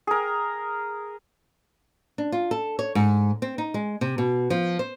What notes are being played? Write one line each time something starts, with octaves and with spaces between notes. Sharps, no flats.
G#4 A#4
D4
F4
A4
C#5
G#2
C4
D#4
G#3
C3
B2
F3
C5